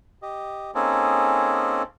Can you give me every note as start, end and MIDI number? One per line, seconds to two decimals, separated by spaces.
0.22 0.71 67
0.22 0.71 75
0.75 1.83 58
0.75 1.83 60
0.75 1.83 61
0.75 1.83 63
0.75 1.83 68
0.75 1.83 69